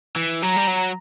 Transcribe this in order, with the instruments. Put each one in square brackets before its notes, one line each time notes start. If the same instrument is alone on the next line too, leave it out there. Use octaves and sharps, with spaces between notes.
[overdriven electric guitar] E3
[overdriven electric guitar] F#3 [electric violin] A#5
[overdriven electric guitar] G3
F#3